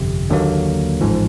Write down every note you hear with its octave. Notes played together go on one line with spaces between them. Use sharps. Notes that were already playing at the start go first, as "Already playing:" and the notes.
Already playing: G1 F2 C3
D#2 D3 F#3 A#3
A1 G#2 F3